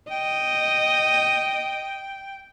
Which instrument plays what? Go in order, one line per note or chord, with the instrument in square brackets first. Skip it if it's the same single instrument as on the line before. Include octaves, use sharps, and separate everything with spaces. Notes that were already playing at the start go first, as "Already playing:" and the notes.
[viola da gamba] D#5 [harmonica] G5